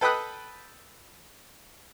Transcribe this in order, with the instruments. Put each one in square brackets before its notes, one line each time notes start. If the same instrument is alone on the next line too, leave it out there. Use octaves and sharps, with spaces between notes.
[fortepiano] A4 B4 G5 B5 D#6 F#6